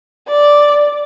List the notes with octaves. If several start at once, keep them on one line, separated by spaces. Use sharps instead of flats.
D5